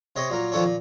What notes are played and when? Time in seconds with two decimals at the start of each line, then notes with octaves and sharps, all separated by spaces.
0.16 C3 C#5 D#5
0.30 A#2 F#3 A#4
0.52 D#3 F3 D4 A4 C#5
0.65 A#2